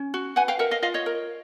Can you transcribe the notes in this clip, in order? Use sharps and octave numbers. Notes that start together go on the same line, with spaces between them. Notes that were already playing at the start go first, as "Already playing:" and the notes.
Already playing: C#4
F#4
B4 F#5 G#5
F5 G5
A#4 E5 F#5
D#5 F5
F4 D#5 F5
C#5 D#5
A#4